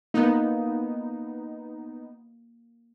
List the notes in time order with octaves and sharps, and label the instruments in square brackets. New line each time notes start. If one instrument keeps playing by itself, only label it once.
[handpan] A#3 [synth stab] B3 D#4